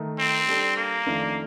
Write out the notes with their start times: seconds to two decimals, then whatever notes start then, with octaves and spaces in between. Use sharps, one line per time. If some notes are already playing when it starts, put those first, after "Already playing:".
Already playing: D#3 A3 D#4
0.19 C4
0.47 G3 D4 A4
0.77 A#3
1.06 F2 D#3 A3 D4 F4